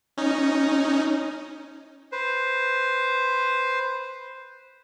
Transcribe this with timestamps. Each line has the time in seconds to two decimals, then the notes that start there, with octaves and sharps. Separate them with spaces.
0.17 C#4 D#4
2.12 B4 C5